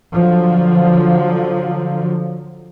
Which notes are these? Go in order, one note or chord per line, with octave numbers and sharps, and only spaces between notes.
D3 F3 F#3